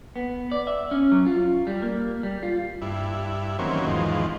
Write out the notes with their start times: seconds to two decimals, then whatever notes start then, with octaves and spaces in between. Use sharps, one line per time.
0.16 B3
0.52 D5
0.67 E5
0.91 C#4
1.12 F#3
1.26 F4
1.67 G3
1.82 A#3
2.23 G3
2.43 F4
2.82 G2 E4
3.59 D#3 E3 F#3 A#3 C4 C#4
3.86 E2 G#2 D#3 F3